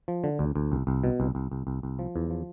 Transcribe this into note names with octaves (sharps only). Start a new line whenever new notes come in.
F3
D3
D2
D2
C2
C2
B2
C2
C2
C2
C2
C2
F3
E2
F3